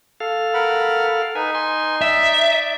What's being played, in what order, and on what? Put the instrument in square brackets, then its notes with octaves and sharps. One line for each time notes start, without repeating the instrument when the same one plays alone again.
[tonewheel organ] A4 F5
[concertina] A#4 F#5 B5
[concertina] D#4 [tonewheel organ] B4 G#5
[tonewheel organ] G#5 C6
[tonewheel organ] D5 [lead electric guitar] E5